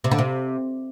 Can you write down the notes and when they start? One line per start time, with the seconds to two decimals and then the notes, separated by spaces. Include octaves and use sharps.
0.04 C3
0.11 D3
0.19 C3